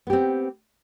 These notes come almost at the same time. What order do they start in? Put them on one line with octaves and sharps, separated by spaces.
B3 G4 C4